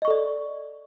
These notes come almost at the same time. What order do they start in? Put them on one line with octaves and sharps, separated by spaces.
D#5 C#6 A4 D5